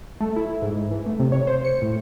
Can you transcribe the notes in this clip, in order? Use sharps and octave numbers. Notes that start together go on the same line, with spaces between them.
A3
E4
G#2
E3
A3
C3
C#5
C5
C#7
A2